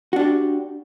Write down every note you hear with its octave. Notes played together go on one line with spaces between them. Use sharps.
D4 F#4 G4